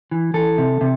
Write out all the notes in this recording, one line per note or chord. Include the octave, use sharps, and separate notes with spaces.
E3
E3 A4
C3
C3